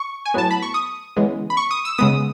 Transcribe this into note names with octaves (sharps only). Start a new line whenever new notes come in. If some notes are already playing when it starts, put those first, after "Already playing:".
Already playing: C#6
G#5
A2 F#3 B3 A5
B5
C#6
D#6
C#3 E3 G#3 B3
B5
C#6
D#6
E6
C#3 G#3 B3 D#6